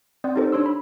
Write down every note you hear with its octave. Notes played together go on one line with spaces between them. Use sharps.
C4 D5 F#5 C6 D#6 G6
D#4 F4 G4 A4 A#4 C5
D4 C#5 C6 E6
B5